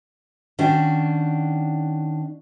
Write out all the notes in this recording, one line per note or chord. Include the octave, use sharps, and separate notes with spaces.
D#3 C#4 D4 F#4